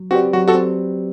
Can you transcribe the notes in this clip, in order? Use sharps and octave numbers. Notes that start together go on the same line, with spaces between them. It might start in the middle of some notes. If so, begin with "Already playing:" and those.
Already playing: F#3
C4 F#4 G4 B4 D5
F#3 F#4
F#4 A4
C4